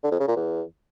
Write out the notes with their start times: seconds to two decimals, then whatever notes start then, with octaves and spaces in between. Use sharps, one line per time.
0.04 D3
0.12 F2
0.20 C#3
0.28 A#2
0.36 E2